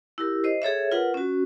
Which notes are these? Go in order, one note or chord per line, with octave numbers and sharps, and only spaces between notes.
E4 G4 A#4
C5 D#5
G#4 A4 C#5 E5
F4 A#4 B4 F#5
C#4 F#4